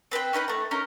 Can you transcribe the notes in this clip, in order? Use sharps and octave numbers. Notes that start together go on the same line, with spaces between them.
C4 B4 C5 G5
C#4 D#4 B4 B5
A3 A#5
C#4 D#4 A#4